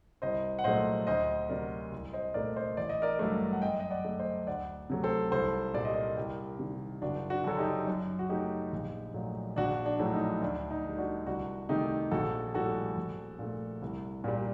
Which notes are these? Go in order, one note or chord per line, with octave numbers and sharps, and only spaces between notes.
C2 C5 D#5
F#5
A#2 F#3 A3 C5 D#5
D2 C5 D#5
C3 F#3 A#4 D5
C2
C5 D#5
A#2 A3 A#4 D5
C5 D#5
A1 D5
D#5
A#4 D5
G2 F#3 A3
F#5
F#2 D#5 G5
D#5
D5 F#5
D3 A3
C5 D#5
D2 D5 F#5
C3 F#3 A3
A4 C5
C2 A4 C5
A#2 G3 D5
D#5
A#4 D5
C2 G4 A#4
C3 D#3 G3
F#1 D4 F#4
D4 F#4
F#2 D3 F#3 A4
D#4 G4
F#2
F#4
F#3 A3 D#4 G4
A#1
A#2 F#3 A3
A#1 D4 F#4
D4
A2 F#3 A3
D#4
D2 D4
D#4
D3 G3
D4 F#4
C2 D4 F#4
C3 D#3 A3 D#4 G4
A#1 F#4 A4
A2 G3 F#4 A4
A#1
A#2 A3
C2
A#2 G3